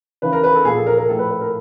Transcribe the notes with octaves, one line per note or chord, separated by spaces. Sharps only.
C#3 E3 B4
A#4
B4
A4
A#2 F3 G#4
A4
A#4
A#4
A2 F3 A4
B4
B4
A#4